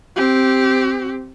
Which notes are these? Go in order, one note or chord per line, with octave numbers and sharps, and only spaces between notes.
C4 G4